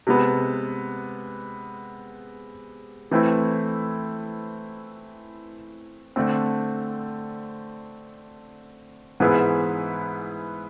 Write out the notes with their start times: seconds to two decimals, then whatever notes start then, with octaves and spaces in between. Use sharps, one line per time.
0.07 C3 G#3 B3
3.11 E3 A3 C4 E4
6.16 D3 A3 C4
9.20 G#2 E3 B3 E4 G#4